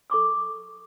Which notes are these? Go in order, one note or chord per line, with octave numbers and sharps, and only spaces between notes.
A4 C#6 D6 E6